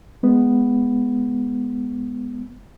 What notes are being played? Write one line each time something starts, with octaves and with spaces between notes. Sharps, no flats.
G#3 B3